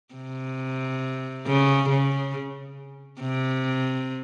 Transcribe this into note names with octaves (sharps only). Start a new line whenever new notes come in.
C3
C#3
C#3
C3